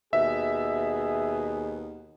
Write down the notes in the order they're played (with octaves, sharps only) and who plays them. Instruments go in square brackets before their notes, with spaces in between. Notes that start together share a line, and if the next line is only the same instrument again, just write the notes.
[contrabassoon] D#2 [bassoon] B2 [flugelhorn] G#4 [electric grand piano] E5